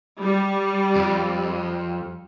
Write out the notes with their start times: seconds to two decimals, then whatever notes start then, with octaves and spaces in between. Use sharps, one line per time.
0.22 G3
0.96 F2